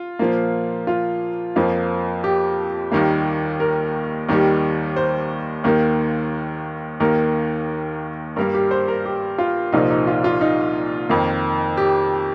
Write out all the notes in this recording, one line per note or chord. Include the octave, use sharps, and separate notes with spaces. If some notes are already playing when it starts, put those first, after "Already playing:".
Already playing: F4
A#2 F3 A#3
F4
F2 F3 A#3
G4
D#2 D#3 G3 A#3
A#4
D#2 D#3 G3
C5
D#2 D#3 A#3
D#2 D#3 A#3 A#4
G2 G3 A#3 A#4
G4
C5
A#4
G4
F4
C2 A#2 F3 A#3 D#4
D#4
F4
F4
D#4
F2 D#3 A#3
G4